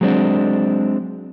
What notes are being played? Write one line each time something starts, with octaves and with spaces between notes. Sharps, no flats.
F#3 G#3 C4 D4